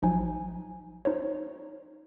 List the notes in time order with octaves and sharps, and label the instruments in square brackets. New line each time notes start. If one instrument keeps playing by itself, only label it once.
[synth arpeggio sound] A1 F3 F#3 D#4 G#5
D#4 C5 C#5